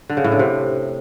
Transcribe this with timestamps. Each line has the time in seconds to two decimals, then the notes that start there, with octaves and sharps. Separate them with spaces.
0.09 D3
0.17 C#3
0.24 A2
0.32 D3
0.39 C3